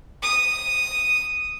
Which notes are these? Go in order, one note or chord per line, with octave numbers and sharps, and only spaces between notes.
D#6